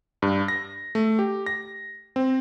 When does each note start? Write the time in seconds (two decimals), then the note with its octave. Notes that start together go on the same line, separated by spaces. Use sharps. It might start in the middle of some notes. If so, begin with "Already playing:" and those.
0.22 G2
0.48 A#6
0.95 A3
1.19 G4
1.46 A#6
2.16 C4